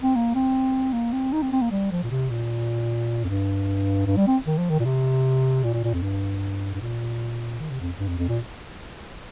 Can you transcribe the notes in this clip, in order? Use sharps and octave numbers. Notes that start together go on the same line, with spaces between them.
C4
A#3
C4
A#3
C4
D#4
C4
C4
A#3
G3
F3
A#2
C3
A#2
F2
G2
G2
G3
C4
D#3
F3
D#3
A#2
C3
A#2
A#2
A#2
F2
G2
G2
A#2
D#3
C3
F2
G2
F2
F2
A#2